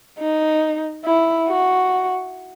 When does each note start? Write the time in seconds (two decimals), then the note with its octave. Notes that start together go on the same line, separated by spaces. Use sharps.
0.20 D#4
1.05 E4
1.48 F#4